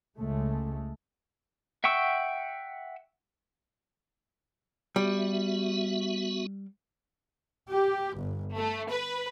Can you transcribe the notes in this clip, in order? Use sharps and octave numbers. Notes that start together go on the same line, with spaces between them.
C#2 G#3 A3
E5 F#5 G5 C#6 E6
G3 B3 F#4 E5
G4
G1
A3
B4